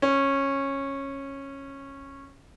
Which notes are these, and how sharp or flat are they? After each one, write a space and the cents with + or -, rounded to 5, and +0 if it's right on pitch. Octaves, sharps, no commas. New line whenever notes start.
C#4 -15